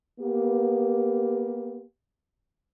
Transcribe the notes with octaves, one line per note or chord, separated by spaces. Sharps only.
A#3 B3 G4